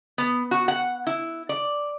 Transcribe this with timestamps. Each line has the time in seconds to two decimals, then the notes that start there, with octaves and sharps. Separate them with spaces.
0.18 B3
0.51 F#4
0.68 F#5
1.07 E4
1.49 D5